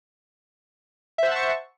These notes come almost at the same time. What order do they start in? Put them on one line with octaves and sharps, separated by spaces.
E5 C5 F#5 A5 C#6